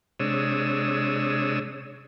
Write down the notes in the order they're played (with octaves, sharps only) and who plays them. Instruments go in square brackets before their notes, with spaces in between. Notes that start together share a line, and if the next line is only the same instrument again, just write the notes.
[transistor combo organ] C3 G#3 D4 C#5 D#6 E6